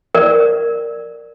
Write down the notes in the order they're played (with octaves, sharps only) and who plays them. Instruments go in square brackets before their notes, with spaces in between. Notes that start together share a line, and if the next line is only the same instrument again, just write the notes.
[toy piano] A#4 D5